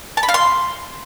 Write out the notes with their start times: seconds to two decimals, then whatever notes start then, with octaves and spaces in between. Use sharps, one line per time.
0.17 A5
0.23 B5
0.29 F5
0.34 C6